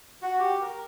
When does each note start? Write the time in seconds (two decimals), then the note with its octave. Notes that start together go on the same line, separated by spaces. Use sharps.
0.22 F#4
0.39 G4
0.62 A#4